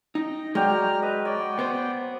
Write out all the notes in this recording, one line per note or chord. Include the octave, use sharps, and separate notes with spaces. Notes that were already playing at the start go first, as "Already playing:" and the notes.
D#4 D#5 G5
F#3 G#3 D5 G5 A#5 F6
B4 D#5
C#5 D5 G5
B3 C5